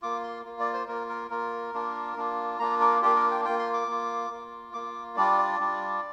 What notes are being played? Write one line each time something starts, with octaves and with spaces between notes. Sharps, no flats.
A#3 F4 D6
C6
A#3 F4
D5
C5
A#3 F4 A#4
A#4
A#3 F4 A#4
A#3 D4 F4
A#3 D4 F4
A#3 D4 F4 A#5
A#4
A#3 D4 F4 G4
A#4
G5
A#3 F4 G5
C6
D6
A#3 F4
A#3 F4
A#3 F4 D6
G3 D4 F4 D5
D5
G3 D4 F4